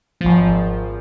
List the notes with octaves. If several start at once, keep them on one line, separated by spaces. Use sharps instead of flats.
G#1 F3